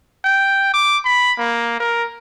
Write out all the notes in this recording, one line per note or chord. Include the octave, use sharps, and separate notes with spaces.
G5
D6
B5
A#3
A#4